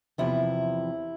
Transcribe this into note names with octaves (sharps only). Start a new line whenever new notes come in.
E2 C3 F3 E4